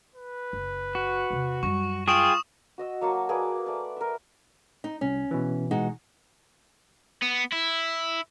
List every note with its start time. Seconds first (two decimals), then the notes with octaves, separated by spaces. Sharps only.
0.15 B4
0.53 F#1
0.95 F#4
1.30 E2 C3
1.63 F#2 G3 C#6
2.08 F4 G#4 G5 C#6 D#6 E7
2.78 F#4 D#5 E6
3.01 F#3 A#3 A5 C#6
3.29 A#3 G#4 B4 D5
3.66 A3 D5
3.97 A#4 E5
4.84 D#4
5.01 C2 C#4
5.31 B2 E3
5.71 G#3 D#4 F#4
7.22 B3
7.53 E4